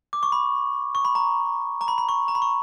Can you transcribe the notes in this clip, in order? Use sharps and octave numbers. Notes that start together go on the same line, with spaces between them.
D6
C#6
B5
C#6
B5
A#5
A#5
B5
B5
C#6
A#5
B5
C#6